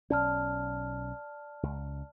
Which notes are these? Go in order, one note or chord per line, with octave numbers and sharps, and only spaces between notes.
B1 C#4 D5 A5 F6
C#2